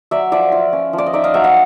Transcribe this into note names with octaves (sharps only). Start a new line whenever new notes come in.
F#3 D5 E5
F3 D5 E5
F4
C#4
F3
D5
D#5
D#4 D5 E5
D#5 F5
F#3 E5 F#5
D#5 F5